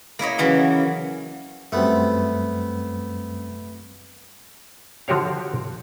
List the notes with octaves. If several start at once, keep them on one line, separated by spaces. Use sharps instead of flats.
A#3 E4 C#5 D#5
C#3 E3 F#3 C#4
F#2 G3 A3 B3 C4
D3 F3 F#4 G4 C#5 F5